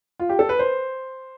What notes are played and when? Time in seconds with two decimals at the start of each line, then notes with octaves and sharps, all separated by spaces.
0.20 F4
0.29 G4
0.39 A4
0.49 B4
0.59 C5